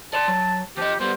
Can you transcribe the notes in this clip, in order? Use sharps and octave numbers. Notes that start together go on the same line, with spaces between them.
D5 A5 C6
F#3
F3 G4 D#5
G3 B3 C5